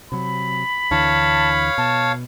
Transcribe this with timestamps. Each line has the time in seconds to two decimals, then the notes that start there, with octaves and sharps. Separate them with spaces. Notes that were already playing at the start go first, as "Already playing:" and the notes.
0.12 C3 F#3 B5
0.91 D2 D3 E3 C#5 F5 A5
1.78 B2 A5